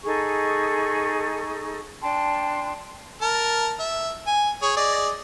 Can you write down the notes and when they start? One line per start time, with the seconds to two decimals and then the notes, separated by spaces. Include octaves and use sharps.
0.04 D#4 G#4 A4 C#6
2.02 D4 G5 A5 C6
3.21 A#4 A5
3.79 E5
4.27 G#5
4.62 G#4 C#5
4.77 G#4 D5 D#5